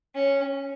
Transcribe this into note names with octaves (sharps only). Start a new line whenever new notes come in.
C#4